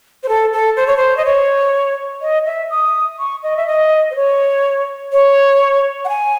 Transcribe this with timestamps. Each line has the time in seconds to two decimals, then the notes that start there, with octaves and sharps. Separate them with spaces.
0.23 C5
0.29 A4
0.53 A4
0.76 C5
0.87 C#5
0.97 C5
1.17 D#5
1.25 C#5
2.22 D#5
2.46 E5
2.70 D#6
3.19 C#6
3.43 D#5
3.57 E5
3.67 D#5
4.11 C5
4.15 C#5
5.13 C#5
6.05 F#5
6.09 G#5